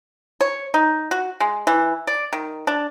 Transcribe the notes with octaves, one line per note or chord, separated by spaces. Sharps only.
C#5
D#4
F#4
G#3
E3
D5
D#3
D4